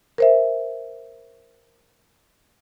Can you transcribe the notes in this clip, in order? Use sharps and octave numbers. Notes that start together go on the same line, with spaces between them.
A#4 C5 E5